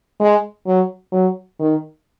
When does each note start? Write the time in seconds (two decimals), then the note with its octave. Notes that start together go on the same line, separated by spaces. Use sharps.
0.20 G#3
0.66 F#3
1.12 F#3
1.59 D#3